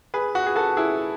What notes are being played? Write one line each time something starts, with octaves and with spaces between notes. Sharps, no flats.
G#4 B4
F#4
G#4
F#4 A4
E4 G#4